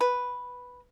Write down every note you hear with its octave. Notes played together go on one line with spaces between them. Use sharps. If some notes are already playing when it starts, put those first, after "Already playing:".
B4